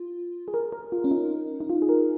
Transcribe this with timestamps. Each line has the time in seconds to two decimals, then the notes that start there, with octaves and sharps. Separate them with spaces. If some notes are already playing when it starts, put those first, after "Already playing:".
Already playing: F4
0.48 G#4
0.54 A#4
0.72 A#4
0.92 F4
1.04 C#4
1.11 D#4
1.60 D#4
1.70 F4
1.82 G#4
1.89 A#4